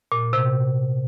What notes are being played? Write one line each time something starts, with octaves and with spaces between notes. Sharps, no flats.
A#2
C3